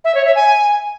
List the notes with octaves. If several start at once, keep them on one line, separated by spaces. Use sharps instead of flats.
E5
C#5
E5
G#5